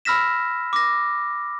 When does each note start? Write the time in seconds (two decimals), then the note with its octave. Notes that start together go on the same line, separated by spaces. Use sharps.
0.05 B5 E6 F6 A#6 B6 E7
0.73 D6 A#6